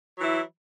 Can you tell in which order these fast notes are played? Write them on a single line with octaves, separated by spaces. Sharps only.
F#3 E3 E4